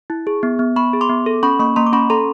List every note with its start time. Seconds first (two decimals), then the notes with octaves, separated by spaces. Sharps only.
0.10 E4
0.27 G#4
0.43 B3
0.59 B3
0.76 B3 B5 C#6
0.93 G#4
1.01 C6 D6
1.09 B3
1.26 A4
1.43 C#4 B5 C#6
1.59 A#3 B5 C#6
1.76 A#3 A#5 C6
1.87 D6
1.93 C#4 B5 C#6
2.10 A4 A#5 C6